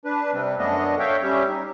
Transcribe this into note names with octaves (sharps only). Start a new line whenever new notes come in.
D4 B4
C3 G3 C4
F#2 A3 B3 D4 D#5
C#5 E5 F5 G5
G3 C#4 G4 E5
D#4